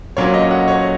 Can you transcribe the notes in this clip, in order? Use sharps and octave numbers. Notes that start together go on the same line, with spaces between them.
A#2 F#3 C#4 C#5
D#5
F#5
C#5